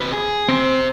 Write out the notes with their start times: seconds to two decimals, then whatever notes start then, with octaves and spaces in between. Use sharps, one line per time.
0.01 C3 B4
0.13 G#4
0.49 C3 C4 C5